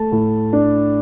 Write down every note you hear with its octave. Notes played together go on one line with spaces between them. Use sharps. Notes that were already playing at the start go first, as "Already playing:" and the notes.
Already playing: A3 A5
A2
D4